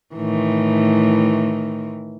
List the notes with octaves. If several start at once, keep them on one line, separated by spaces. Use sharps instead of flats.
A2 D#3 E3